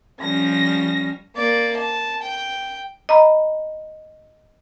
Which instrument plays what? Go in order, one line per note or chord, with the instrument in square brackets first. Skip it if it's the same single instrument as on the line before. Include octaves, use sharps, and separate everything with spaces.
[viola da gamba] F3 G3 C#4 [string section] A#6
[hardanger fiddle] A#3 D5
A5
G5
[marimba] D#5 A#5 B5